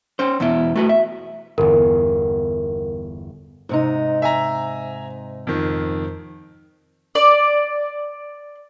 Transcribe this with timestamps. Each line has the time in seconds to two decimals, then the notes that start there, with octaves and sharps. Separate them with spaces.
0.19 C#4 C5
0.40 E2 B2 E4
0.76 A3 F#4 B4
0.89 E5
1.58 G1 E2 A#4
3.69 G#2 C3 D#4
4.22 E5 G#5 A#5
5.47 F2 D#3
7.15 D5